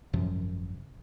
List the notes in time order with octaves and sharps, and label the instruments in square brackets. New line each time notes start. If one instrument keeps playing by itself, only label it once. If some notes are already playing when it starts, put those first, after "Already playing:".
[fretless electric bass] G#1 F#2 C3 F3